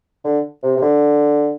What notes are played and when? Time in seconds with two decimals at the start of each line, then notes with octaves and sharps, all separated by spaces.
0.25 D3
0.63 C3
0.77 C3
0.82 D3